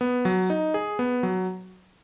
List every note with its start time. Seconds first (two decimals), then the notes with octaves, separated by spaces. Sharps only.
0.01 B3
0.25 F#3
0.50 D#4
0.74 G#4
0.99 B3
1.23 F#3